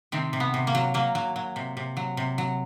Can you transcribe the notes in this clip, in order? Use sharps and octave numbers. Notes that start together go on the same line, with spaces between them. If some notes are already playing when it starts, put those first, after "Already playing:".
C3 D#3 C4
C3
B3
C3
A#3
F#3
F#3 A#3
F#3
F#3
C3
C3
F#3
C3
F#3